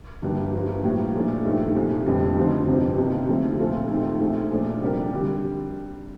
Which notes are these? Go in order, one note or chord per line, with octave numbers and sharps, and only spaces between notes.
G1 G2 D3 G3 A#3
G1 G2 F3 A#3
A2 G3 A#3
A#2 F3 A3 D4
G2 D#3 A3
C2 A#2 F3
F1 F2 D3 G3
D2 D3 F3 C4 D#4
G1 F2 C3
C2 C3 D#3 A#3
D2 C3 F3 A3
A#2 A3 C4 F4 A4
D#2 D#3 A3 C4
A#1 A#2 A3 C4
A#2 F3 A3 D4
C3 G3 D4 G4 A#4
D3 G3